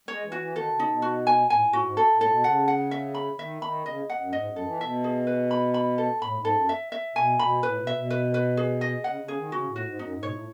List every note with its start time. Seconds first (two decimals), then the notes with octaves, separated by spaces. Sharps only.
0.08 G#3 C#5
0.24 E3
0.32 F#4
0.39 E3
0.55 D#3 A4
0.71 C#3
0.79 D#4
0.86 B2
1.02 F#4
1.27 G#5
1.50 A2 G#5
1.66 A2
1.73 F#4
1.81 G#2
1.97 A4
2.13 A2
2.21 A4
2.29 B2
2.44 C#3 F#5
2.68 F#5
2.91 E5
3.14 B5
3.38 D#3 E5
3.62 D#3 B5
3.86 C#3 D#5
4.10 F#5
4.18 F#2
4.32 G#2 D#5
4.49 F#2
4.56 A4
4.64 E3
4.80 B2 E5
5.04 G#4
5.27 B4
5.51 B5
5.74 B5
5.98 A4
6.21 A2 B5
6.38 G#2
6.45 A4
6.54 F#2
6.69 E5
6.92 E5
7.16 B2 G#5
7.39 B2 B5
7.63 A2 B4
7.79 B2
7.87 E5
7.95 B2
8.10 B4
8.34 B4
8.57 G#4
8.81 D#5
9.04 C#3 F#5
9.21 C#3
9.28 G#4
9.37 D#3
9.52 C#3 F#4
9.68 A2
9.76 F#4
9.83 G#2
9.99 F#2 D#4
10.15 G#2
10.23 B2 C#5
10.31 A2